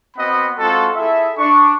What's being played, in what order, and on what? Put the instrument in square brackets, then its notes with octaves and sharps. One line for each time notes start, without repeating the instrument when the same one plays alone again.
[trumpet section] B3 C4 F#4 D#5 F#5 B5
G#3 C4 F4 F#4 A4
E4 G#4 A4 E5
D4 C#6